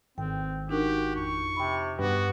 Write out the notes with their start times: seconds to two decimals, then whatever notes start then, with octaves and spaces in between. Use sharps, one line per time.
0.18 G#1 C4 G5
0.69 D4 D#4 F#4 G4 A#4
1.16 F2 C#6
1.57 C3 G5 B5
1.99 G2 B3 F#4 G4 B4